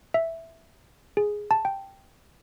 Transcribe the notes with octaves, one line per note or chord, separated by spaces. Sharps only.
E5
G#4
A5
G5